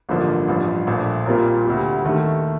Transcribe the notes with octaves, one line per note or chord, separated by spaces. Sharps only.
A1 G2 D3 F3 A#3
A1 G2 F3
A#1 A#2 A3
A#2 G3 C4 F4 A#4
D2 C3 G3
D#2 D#3 A3